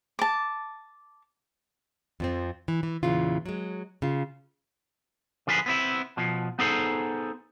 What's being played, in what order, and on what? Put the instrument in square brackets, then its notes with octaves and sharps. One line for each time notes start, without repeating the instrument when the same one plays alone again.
[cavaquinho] A5 D6
[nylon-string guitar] F2 F3 C4
E3
E3
E2 A#2 C#3 E3 F4
F#3 G#3
C#3 F4
[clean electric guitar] D3 F3 F4 G#4 B4
B3 C4 E4
B2 F3
B3 D#4 G#4 A4 C5